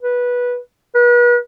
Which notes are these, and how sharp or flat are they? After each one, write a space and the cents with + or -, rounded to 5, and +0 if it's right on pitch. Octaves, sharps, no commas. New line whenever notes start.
B4 -15
B4 -40